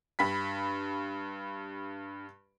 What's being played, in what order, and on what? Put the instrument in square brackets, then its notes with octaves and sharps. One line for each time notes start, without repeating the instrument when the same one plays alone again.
[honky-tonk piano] G2 B5 B6